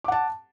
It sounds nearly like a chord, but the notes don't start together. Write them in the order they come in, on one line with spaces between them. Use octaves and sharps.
D6 F#5 A5